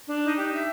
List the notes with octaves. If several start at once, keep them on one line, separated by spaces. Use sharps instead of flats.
D4
D#4
G4
E5